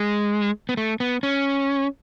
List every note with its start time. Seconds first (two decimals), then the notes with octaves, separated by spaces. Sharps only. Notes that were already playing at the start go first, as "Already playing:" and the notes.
Already playing: G#3
0.69 B3
0.77 A3
1.00 B3
1.23 C#4